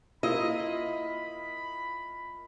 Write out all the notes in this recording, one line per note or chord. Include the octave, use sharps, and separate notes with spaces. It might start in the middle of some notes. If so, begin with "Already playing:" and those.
A#3 E4 F4 D#5 B5